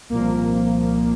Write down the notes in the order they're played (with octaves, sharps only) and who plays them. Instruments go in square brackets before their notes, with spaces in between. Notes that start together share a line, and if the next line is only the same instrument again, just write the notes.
[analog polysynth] C2 A#2 F3 A#3